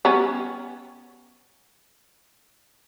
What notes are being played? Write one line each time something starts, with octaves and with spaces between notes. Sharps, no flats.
G3 B3 C#4